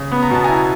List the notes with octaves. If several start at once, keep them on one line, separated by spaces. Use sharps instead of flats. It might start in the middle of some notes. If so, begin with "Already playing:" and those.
Already playing: C#3
B3 B5
A#5
B2 A5
E4 G#5 A#5